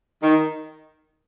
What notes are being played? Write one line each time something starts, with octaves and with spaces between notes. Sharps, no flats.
D#3